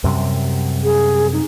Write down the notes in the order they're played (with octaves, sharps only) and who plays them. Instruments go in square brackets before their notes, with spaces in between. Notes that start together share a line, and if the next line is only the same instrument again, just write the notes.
[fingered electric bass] F#2 C3 G3
[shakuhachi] G#4
D#4